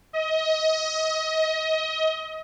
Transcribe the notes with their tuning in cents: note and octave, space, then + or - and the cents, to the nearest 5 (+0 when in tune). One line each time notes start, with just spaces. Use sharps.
D#5 +30